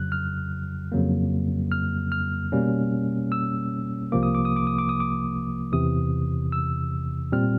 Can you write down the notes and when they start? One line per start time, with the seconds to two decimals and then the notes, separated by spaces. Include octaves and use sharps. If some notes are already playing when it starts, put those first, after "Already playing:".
Already playing: F2 C#3 F#3 F#6
0.12 F6
0.92 F2 C#3 F#3 A#3
1.72 F6
2.12 F6
2.52 B2 G3 A#3 C#4
3.32 E6
4.12 C2 C3 F3 A#3 D6
4.23 D#6
4.35 D6
4.45 D#6
4.56 D6
4.67 D#6
4.79 D6
4.89 D#6
5.00 D6
5.72 E2 C3 E3 D#6
6.52 E6
7.32 A#2 G3 C4 F6